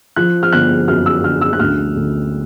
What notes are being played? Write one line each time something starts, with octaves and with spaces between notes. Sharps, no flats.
F3 F#6
F6
G1 F#6
F#2 F6
E6
D3 F6
E6
F#6
D2 F6
D2